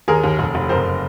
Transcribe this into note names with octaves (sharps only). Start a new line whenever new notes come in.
D#2 G#4 A#4
D#2
F1
F1
F#1 A#4 C5